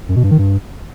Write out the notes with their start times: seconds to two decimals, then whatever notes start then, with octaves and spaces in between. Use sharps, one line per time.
0.09 F#2
0.16 B2
0.23 G2
0.31 D#3
0.38 G2